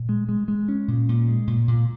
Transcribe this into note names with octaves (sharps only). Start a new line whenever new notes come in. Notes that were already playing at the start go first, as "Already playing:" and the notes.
Already playing: A#2
G#3
G#3
G#3
C#4
A#2
A#2
G#3
A#2
A#2